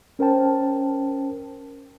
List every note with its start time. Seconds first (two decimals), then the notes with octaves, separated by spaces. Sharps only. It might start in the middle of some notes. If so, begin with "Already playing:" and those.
0.19 C#4 A#4 C5 G5 A5